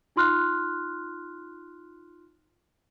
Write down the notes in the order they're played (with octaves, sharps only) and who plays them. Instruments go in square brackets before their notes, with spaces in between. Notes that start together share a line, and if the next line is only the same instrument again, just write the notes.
[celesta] D#4 F4 C6 F6 F#6